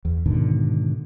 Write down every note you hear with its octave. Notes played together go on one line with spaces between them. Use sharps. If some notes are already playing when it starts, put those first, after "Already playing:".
E2
G#2 B2 D3 D#3